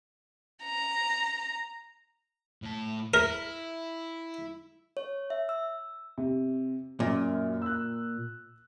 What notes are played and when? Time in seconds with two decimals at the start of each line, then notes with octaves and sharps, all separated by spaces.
0.63 A#5
2.62 A2 A5
3.14 E4 A#4
4.97 C#5
5.30 E5
5.49 E6
6.18 C3
7.00 F#2 A#2
7.62 E6 F#6